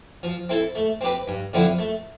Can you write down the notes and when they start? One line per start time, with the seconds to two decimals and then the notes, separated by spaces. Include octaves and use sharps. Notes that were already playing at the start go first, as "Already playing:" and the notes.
0.23 F3
0.49 C4 E4 A4
0.75 A3
1.01 C4 G4 B4
1.28 G2
1.53 D3 F3 C4 E4
1.78 A3